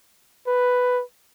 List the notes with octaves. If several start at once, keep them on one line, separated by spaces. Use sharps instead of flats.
B4